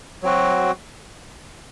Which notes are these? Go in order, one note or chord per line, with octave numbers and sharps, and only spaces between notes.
F#3 C4 F#4